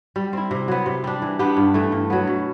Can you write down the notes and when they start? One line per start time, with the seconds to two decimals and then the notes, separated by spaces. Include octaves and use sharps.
0.16 G3
0.33 C4 E4
0.51 C3
0.68 F#3 B3
0.86 C3
1.04 G3 D4
1.22 E3
1.39 B3 D4 G4
1.57 G2
1.74 E3 A3
1.92 G2
2.10 F#3 B3
2.27 B2